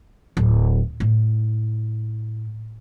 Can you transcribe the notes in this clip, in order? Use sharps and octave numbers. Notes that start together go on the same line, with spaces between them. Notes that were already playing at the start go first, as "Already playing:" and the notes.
D1
A2